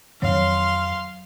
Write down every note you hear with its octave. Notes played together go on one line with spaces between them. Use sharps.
F2 D#3 F#3 C4 C#5 F5 C6